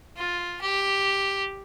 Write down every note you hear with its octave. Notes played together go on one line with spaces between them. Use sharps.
F4
G4